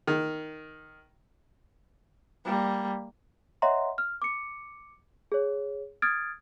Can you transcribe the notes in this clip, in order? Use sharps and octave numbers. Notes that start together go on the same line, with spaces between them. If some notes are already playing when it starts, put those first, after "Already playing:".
D#3
G3 A#3
C#5 D#5 E5 F#5 A#5 C6
F6
D6 C#7
G#4 C#5
D#6 F6 G#6 A6 D7